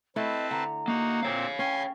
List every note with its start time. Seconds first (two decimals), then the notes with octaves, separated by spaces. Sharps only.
0.16 A3 C4 E4 B4 D#5 A5
0.51 D3 A#5
0.88 A#3 D#4 F#4
1.23 A#2 C4 C#5 F5
1.59 C#4 G5 G#5 C6